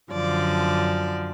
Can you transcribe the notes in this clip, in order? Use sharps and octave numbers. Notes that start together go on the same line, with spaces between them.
F#2 D3 F3 D5